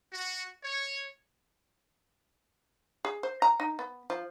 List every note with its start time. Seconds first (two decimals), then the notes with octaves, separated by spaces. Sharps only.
0.13 F#4
0.63 C#5
3.05 G#4
3.23 C5
3.42 A#5
3.60 D#4
3.79 B3
4.10 F3